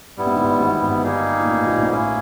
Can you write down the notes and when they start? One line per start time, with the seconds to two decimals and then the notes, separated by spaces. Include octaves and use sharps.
0.17 G2 G3 B3 E4
0.27 G#2
0.36 G1 G2
0.60 G#1 G#2
0.81 G1 G2
1.03 G3 A#3 D#4 G#4
1.40 A#2
1.46 A1 A2
1.67 A#1 A#2
1.83 G#2
1.88 A1 A2 A#3 C#4 E4 G#4